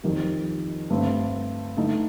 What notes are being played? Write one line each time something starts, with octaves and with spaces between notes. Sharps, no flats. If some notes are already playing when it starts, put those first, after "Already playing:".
F2 D#3 G3
G2 D3 A3 C4
D3 A3 D#4